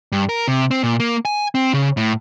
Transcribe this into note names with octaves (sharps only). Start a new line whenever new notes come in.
G2
A#4
C3
C4
A#2
A#3
G#5
C4
C#3
A2